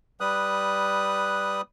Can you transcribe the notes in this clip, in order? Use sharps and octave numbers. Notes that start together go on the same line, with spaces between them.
G3 B4 D#6 F#6